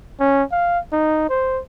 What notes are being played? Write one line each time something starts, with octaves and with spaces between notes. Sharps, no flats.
C#4
F5
D#4
C5